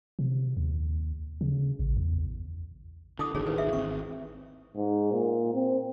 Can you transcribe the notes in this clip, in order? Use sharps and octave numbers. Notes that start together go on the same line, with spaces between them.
C3
D#2
C#3
A1
E2
D3 E4 D6 D#6
A1 D2 D#3 G#4 C#5
B4 C5
E5
G#1 C4 C#6
G#2
A#2
C4